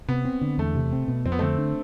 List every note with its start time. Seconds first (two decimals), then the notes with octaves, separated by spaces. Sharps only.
0.08 C3 B3
0.25 C4
0.41 D3
0.58 E2 A3
0.75 C3
0.92 C4
1.08 B2
1.25 F2 C4
1.32 B3
1.39 D3 A3 C4
1.58 D4